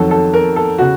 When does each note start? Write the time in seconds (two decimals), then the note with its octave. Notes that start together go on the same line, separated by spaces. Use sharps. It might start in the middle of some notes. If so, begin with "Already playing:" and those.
Already playing: F2 D#3 F#3 A4
0.11 A4
0.34 A#4
0.56 A4
0.78 C#3 F#4